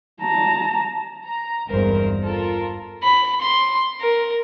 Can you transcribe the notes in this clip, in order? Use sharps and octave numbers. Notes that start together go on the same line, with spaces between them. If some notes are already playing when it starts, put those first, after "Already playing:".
A5 A#5
A#5
G#1 E2 G2 A#4 C5
F4 A4 A#4
B5
C6
A#4